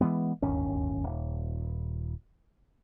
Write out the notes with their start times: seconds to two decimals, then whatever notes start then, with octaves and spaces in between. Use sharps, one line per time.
0.01 E3 F3 G#3 B3
0.42 D1 G1 D#2 C#4
1.04 D#1